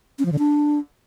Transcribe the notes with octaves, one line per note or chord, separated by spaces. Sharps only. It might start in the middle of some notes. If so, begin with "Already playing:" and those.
C#4
F3
D3
D4